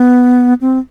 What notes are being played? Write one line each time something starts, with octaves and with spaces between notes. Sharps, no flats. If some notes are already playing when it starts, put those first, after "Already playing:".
Already playing: B3
C4